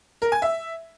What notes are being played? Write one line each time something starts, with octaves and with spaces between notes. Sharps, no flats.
A#4
G#5
E5